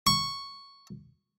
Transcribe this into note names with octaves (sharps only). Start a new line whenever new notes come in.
C#6